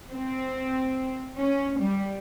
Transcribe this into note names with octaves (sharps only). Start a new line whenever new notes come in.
C4
C#4
G3